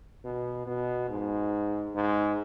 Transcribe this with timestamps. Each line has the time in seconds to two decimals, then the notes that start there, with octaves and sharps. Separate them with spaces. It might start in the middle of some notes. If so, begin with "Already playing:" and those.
0.25 B2
0.67 B2
1.09 G#2
1.95 G#2